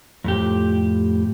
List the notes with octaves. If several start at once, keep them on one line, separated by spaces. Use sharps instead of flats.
F2 A2 G4